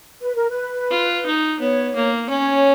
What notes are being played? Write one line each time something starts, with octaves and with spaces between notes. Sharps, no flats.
B4
A#4
B4
F4
D#4
B3 C#5
A#3
C#4 C#5